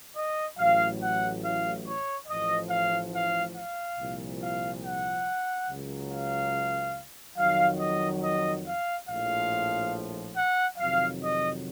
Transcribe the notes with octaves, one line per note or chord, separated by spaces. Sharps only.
D#5
A1 A2 F#3 F5
F#5
F5
C#5
A1 A2 F3 D#5
F5
F5
F5
C2 A#2 F3
F5
F#5
C#2 C#3 F#3
F5
F2 D#3 F#3 F5
D#5
D#5
F5
A#1 A2 F3 F5
F#5
F2 C3 D#3 F#3 F5
D#5